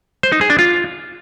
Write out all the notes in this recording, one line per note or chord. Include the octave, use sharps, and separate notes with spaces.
C5
D#4
G#4
D4
F4